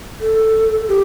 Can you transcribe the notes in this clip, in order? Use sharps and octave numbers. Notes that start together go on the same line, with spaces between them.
A4
G4